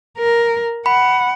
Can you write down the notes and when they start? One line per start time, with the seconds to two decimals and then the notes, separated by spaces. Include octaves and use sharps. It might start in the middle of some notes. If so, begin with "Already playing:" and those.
0.18 A#4
0.86 F#5 B5